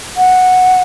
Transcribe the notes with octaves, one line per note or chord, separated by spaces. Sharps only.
F#5